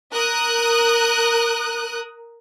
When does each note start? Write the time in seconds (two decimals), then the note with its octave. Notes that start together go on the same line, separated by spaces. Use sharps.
0.13 A#4 D#6 F#6